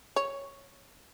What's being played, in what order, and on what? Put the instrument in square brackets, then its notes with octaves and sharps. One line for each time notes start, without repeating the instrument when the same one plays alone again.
[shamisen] C#5